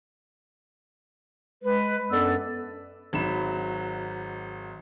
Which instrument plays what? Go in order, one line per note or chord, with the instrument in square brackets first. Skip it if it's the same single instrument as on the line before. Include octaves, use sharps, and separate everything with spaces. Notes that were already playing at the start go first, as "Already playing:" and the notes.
[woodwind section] G#3 B4
F#2 B3 D4 A4 D5 E6
[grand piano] G#1 F#3 G#3 B5 E7